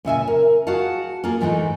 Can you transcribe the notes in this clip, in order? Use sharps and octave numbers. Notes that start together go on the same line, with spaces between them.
A#2 C#3 E5 G#5
A#4
F#4 G#4 F5 F#5 A5
A#3 F4 G#4 A#4
G#2 E3 G#3 A3 D#4